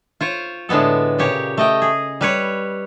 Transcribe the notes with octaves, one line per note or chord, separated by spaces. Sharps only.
F4 C5 C#5
A2 D3 G#3 B3 A4
A#2 C#3 G4 C#5
A3 D#5 G5
G#4
G3 B4 C#5